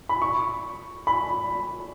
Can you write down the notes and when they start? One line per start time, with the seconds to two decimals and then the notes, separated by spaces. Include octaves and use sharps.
0.09 B5
0.22 C#6
1.07 B5